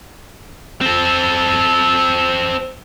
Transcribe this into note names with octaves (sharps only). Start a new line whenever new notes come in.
C4 A4